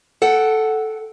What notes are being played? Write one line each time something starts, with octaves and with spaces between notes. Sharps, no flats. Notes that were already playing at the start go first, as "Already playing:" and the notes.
A4 F#5 G5